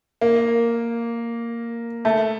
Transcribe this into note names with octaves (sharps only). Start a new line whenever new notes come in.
A#3
A3